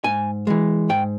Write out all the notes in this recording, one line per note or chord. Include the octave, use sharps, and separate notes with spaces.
G#2 G#5
E3 G#3
G#2 G5